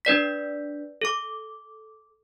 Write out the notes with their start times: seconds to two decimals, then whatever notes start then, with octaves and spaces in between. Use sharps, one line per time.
0.05 D4 B4 D5 B6
1.01 A4 D6